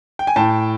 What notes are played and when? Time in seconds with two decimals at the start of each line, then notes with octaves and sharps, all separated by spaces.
0.19 G5
0.27 G#5
0.36 A2 G5 A5